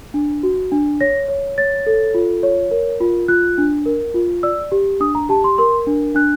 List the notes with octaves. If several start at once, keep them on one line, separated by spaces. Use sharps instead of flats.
D4
F#4
D4
C#5 A#6
C#5
C#5 A6
A4
F4
C#5
A#4
F4
F4 F#6
D4
A#4
F4
D5 E6
G4
D4 D#6
A#5
G4 A5
C6
A#4 C6
D4
D4 F#6